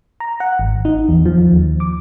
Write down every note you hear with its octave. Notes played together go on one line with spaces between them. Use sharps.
A#5
F#5
G#1
D#4
E2
F3
D#2
D6